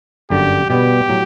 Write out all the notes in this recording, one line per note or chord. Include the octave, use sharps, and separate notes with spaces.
G1 F#2 D3 G4
B2 G3 B3 G4
A2 F#3